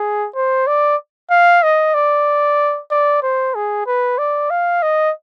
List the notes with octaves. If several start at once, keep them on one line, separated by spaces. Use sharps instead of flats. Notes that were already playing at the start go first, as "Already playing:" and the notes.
Already playing: G#4
C5
D5
F5
D#5
D5
D5
C5
G#4
B4
D5
F5
D#5